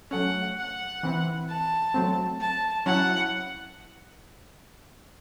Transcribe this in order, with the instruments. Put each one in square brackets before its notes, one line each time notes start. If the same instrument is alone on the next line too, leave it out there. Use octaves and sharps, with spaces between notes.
[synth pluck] F#3 A3 C#4 [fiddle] F#5
[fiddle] F#5
[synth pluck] E3 C4 E4
[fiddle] A5
[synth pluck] F#3 A3 C4
[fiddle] A5
[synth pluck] F#3 C#4 E4 [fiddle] F#5